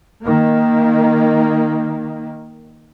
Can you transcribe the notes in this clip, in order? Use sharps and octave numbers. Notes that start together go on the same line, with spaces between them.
D#3 A#3